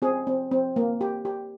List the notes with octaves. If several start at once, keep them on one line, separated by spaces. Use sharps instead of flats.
C4 G#4
C4
C4
A#3
G4
G4